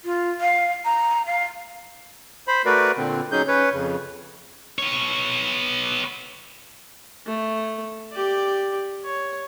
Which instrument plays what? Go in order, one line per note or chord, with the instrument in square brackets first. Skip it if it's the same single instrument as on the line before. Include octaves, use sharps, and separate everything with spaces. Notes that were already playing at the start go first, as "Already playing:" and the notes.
[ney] F4
F5
A#5
F5
[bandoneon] C5 B5
A3 F#4 A#4 B4 D5
A#2 D3 C4
F#3 C#4 D#4 G#4 G6
C#4 B4 C#5
F2 C#3
[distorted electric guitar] B3 C#5
[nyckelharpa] A3
G4 D5
C#5